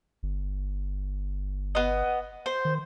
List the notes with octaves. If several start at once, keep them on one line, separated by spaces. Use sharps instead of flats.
G1
B3 D#5
C5
D#3